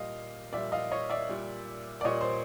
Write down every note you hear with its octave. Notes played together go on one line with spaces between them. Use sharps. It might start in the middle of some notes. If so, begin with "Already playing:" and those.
Already playing: A#2 G3 D#5 F5
A#2 G3 D5 E5
D#5 F5
C#5 D#5
D5 E5
A#2 G3
D5
A#2 G3 C#5 D#5
C5